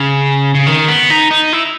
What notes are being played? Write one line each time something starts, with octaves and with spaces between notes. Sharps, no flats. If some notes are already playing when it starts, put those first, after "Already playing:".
Already playing: C#3
C#3
D#3
B3
D#4
D#4
E4